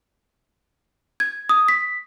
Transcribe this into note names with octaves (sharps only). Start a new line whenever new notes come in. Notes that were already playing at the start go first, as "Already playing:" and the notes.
G#6
D#6
B6